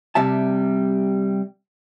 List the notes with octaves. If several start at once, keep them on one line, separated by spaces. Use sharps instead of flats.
C3 G3 E5 A5